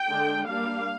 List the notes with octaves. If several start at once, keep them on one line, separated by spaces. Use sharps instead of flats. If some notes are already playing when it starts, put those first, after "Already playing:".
Already playing: G5
D3 G#3 D4
G3 A#3 D4 F5